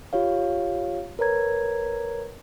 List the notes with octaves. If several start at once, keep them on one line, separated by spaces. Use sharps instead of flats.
F4 G4 C#5 F5
A#4 B4 C#5 A#5 G#6